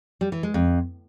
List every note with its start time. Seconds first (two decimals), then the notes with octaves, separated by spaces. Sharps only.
0.21 G3
0.32 E3
0.43 G#3
0.54 F2